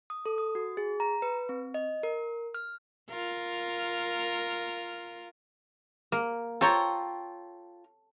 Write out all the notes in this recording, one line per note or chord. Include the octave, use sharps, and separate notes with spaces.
D#6
A4
D#6
F#4
G#4
A#5
B4
C4
D#5
A#4
F6
F4 A#4
A#3
F4 A4 C#5 G5 A#5